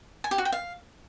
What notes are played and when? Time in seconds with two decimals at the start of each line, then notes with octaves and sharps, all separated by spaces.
0.24 G#5
0.31 G4
0.38 F#4
0.45 G5
0.52 F5